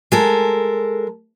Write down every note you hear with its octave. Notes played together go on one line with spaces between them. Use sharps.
G#3 A4 A#4